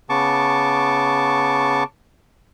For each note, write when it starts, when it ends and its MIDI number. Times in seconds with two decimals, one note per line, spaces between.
0.10 1.84 49
0.10 1.84 59
0.10 1.84 81
0.10 1.84 85
0.10 1.84 86